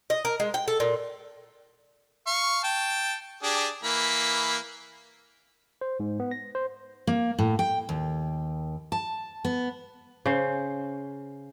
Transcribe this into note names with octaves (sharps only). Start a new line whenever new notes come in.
D#5
A#4
G#3
G5
A4
A#2
F5 C#6
G5 A5
D4 G4 G#4
E3 A#3 B5
C5
G#2
B3
A#6
C5
A#3
A2
G5
D#2
A5
B3
C#3 C5